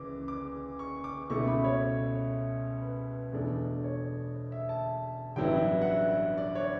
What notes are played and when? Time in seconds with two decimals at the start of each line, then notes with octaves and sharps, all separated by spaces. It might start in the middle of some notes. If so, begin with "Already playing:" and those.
Already playing: C#2 E3 D6
0.28 D6
0.79 C#6
1.04 D6
1.30 C#2 B2 A3 E4 C#6
1.47 B5
1.64 C#5
2.82 B4
3.33 E2 B2 A3 D4
3.84 C#5
4.52 E5
4.69 A5
5.36 A1 G2 F#3 B3 E4 G5
5.82 F#5
5.88 E5
6.38 D5
6.55 C#5